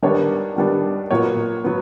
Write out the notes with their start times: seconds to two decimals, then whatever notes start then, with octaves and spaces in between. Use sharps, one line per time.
0.02 D#3 G3 B3 D4 C#5
0.56 D#3 G3 B3 D4
1.10 A#2 F#3 B3 C#5
1.64 F#3 B3